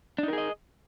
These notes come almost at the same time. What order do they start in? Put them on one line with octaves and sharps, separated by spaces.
D4 D#4 A#4 G#4 D#5